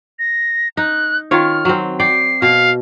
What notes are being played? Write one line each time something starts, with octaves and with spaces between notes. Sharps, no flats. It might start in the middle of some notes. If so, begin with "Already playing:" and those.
A#6
D#4 F#6
D#3 F4 C#5 F6
F#3 C4
D5 G5 C7
B2 F5